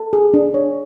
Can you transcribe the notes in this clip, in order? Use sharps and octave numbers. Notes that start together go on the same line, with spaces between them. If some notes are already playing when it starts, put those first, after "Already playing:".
Already playing: A4
G#4
D4
C#5